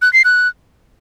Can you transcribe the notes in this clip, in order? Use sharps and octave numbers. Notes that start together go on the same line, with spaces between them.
F#6
C7
F#6